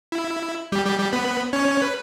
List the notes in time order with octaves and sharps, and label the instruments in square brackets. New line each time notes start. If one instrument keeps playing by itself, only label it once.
[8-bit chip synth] E4
G3 G4
G3 G4
G3 G4
B3 B4
C#4 C#5
B4